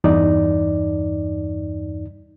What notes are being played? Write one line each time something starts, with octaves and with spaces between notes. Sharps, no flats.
E2 G2 D#4 D5